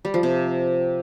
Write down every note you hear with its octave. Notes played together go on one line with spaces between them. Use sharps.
G3
F3
C3